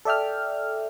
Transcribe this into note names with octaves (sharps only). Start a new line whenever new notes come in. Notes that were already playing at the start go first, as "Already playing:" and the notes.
A4 D5 E5 G5 F6